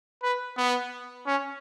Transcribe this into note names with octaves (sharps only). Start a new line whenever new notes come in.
B4
B3
C#4